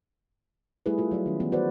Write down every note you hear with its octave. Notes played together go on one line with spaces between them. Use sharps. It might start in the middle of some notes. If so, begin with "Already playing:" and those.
G3 A3 E4 G#4 A4 B4
A3 F4 A4
F#3 D5 E5
D#3 C#4
E3 B3
F#4 B4 C5 D5 F#5